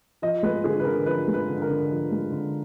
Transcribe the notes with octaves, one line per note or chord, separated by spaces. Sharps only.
F3 D#5
G#3 B4
D3 G#4
B4
D3 A#4
F3 B4
G#3
B4
D3
A#4
D3
F3
G#3
D3